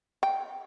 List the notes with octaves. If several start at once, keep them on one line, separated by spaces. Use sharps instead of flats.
G5